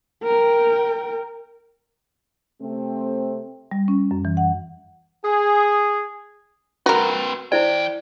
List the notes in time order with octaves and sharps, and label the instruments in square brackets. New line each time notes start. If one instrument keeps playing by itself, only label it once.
[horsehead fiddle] A#4 G5
[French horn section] C3 A3 C4
[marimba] G3
C#4
F#2
E3
F#5
[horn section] G#4
[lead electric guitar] C4 B4 [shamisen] F#4 A#4
[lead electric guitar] E3 G5 [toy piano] E4 C5 D5